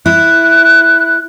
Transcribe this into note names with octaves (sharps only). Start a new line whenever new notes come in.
E4 F#6